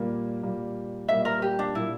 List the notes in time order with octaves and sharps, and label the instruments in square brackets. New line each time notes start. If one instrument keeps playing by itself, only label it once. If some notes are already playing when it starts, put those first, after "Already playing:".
Already playing: [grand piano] A#2 G3 A#3
A#2 G3 A#3
[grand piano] A#2 G3 A#3 [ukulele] E5
[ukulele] A#4
G4
D4
[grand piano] A#2 G3 A#3 [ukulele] E4